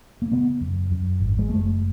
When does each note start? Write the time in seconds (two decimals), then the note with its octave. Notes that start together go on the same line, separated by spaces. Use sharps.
0.22 A#3
0.32 C#3 B3
0.61 F#2
0.91 F#2
1.20 G#1
1.39 G#3
1.49 F#1 A3